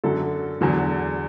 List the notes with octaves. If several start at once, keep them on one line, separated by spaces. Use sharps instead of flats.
F#2 D3 F#3 A4
E2 D3 F#3